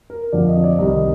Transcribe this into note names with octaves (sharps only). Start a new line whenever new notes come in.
A#4
F2 D3 F3 D5
D#5
D5
C2 C3 D#3 D#5